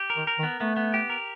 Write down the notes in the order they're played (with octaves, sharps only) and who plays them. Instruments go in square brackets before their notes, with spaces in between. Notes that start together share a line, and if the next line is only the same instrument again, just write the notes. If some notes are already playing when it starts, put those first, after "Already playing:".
Already playing: [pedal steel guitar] G4
A#4
[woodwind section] D#3
[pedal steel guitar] A#4
[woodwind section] D#3
[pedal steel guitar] B3
[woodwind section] A3 [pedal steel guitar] B3
[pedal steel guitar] B3
G4
A#4